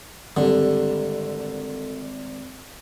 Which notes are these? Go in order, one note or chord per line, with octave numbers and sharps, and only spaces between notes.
G#1 D3 G3